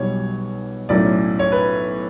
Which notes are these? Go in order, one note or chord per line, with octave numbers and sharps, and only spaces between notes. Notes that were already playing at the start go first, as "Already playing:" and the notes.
Already playing: B1 B2 G3 C#5
B1 A2 F#3 A3 C#4 D5
C#5
B4